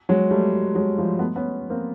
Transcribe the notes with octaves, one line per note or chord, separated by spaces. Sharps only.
F#3 G#3
G3 A3
F#3 G#3
F3 G3
A3 B3
B3 C#4
A#3 C4